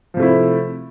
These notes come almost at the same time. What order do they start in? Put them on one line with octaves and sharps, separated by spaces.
F3 C3 A3 E4